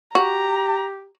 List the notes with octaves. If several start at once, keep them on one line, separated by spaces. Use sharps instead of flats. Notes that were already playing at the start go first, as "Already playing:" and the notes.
F#4 G4 A#5